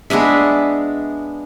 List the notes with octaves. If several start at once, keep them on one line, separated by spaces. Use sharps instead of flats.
G#3 B3 D4 E5